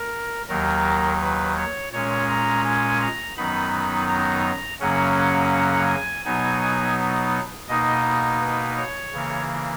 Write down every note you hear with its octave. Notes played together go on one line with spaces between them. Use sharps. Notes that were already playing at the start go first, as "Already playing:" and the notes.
Already playing: A#4
D#2 D#3 F#3 A#4
B4
C#5
A#2 G#3 C#4 C#5
A#5
G#5
A#5
F#2 D#3 F#3 B3 D#4 B5
A#5
F#2 C#3 F#3 A#3 C#4 F#5
F#5
G#5
B2 F#3 B3 D#4 G#5
G#5
B2 A#3 D#4 D#5
B4
C#5
C#3 E3 A#3